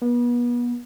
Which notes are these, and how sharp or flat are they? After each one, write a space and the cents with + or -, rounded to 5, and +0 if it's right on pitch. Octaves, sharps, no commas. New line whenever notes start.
B3 -35